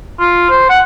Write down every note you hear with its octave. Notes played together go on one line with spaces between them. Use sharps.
F4
C5
F#5